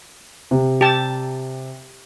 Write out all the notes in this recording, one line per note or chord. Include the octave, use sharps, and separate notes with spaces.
C3
G4 A5